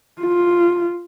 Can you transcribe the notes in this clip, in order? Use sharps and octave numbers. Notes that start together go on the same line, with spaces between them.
F4